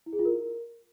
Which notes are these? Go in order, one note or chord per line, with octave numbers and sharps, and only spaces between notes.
E4
G#4
F4
A#4